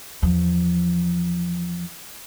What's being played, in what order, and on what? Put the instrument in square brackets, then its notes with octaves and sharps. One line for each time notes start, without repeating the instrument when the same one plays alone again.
[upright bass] E2 F3